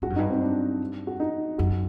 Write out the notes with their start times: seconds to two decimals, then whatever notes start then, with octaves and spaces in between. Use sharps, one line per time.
0.02 G2 F#4
0.10 F#2
0.16 G2 D#4
0.29 C4
0.41 D4
1.07 F#4
1.20 D#4
1.58 F#2 F#4